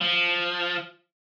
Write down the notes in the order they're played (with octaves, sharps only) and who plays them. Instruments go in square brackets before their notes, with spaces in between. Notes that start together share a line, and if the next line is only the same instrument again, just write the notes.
[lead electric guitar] F3